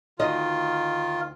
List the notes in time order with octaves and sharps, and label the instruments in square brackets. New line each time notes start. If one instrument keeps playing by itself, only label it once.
[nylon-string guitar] D2 D#4 D#5 [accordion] D#3 F4